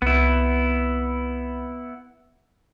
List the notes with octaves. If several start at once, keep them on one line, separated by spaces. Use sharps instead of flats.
C2 B3 E4